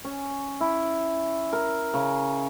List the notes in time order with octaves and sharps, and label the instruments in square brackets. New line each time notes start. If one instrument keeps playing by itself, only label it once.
[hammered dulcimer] C#4
E4
A#4
C#3